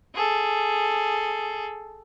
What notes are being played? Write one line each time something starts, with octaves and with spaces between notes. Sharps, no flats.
G#4 A4